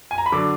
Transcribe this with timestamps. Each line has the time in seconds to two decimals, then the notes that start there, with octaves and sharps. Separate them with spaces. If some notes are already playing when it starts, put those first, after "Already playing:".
0.11 G#5
0.18 A#5
0.26 B5
0.32 D3 F#3 D4 D6